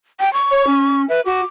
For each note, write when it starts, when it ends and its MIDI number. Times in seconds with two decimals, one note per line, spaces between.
0.20 0.33 79
0.34 1.02 85
0.50 0.65 73
0.66 1.05 61
1.09 1.20 71
1.09 1.21 76
1.25 1.40 66
1.25 1.44 86